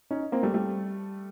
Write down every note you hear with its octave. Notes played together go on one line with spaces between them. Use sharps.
C#4 D#4
A#3 C4
G3 A3
G3 A3